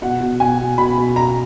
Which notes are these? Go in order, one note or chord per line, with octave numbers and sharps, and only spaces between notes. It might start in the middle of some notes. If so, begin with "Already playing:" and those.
B2 F#5
B2
B2 G#5
B2
B2 B5
B2
B2 A#5